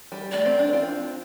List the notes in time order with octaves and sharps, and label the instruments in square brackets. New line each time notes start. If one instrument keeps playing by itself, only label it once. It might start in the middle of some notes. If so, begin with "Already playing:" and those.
[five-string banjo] G3
[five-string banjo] A3 [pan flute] D5
[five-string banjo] C4
D4
C4 F4